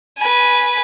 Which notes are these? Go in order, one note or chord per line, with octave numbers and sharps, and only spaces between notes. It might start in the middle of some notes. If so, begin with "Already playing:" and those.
B4 G#5